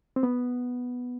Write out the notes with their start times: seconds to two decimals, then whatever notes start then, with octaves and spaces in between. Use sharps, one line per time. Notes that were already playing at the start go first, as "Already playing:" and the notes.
0.16 C4
0.23 B3